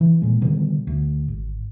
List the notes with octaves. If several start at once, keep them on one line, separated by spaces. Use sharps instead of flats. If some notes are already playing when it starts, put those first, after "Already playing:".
E3
A#2 G#3
B2 D3 D#3 G3
D2
G#1